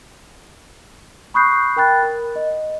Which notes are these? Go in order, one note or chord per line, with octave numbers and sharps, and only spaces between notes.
B5 C#6 D#6 F#6 G6 C7
A#4 G5 B5 F#6 A6
A#4
D#5